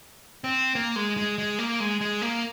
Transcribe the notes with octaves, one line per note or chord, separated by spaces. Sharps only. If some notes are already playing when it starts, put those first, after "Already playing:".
C4
A#3
G#3
G#3
G#3
A#3
G#3
G#3
A#3